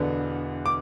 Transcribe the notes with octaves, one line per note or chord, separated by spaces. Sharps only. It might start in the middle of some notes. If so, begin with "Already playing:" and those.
Already playing: E1 E2 D3 B3 D4
D6